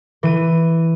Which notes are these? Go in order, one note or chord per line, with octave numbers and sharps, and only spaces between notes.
E3 D#7